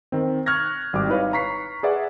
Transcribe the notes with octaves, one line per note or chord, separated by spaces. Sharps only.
D#3 C4
C#6 F6 F#6 G#6 A#6
G#1 G3 D6
D#4 E4 B4 C#5 F5
A#5 C#6 B6 C7
G#4 B4 D5 E5 F#5